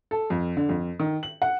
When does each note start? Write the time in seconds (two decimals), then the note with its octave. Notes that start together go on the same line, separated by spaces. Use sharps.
0.11 A4
0.30 F2
0.57 D3
0.69 F2
0.99 D#3
1.23 F#7
1.42 F#5